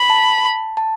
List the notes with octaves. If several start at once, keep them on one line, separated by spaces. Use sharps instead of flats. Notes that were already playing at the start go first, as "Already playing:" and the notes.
Already playing: B5
A5
A5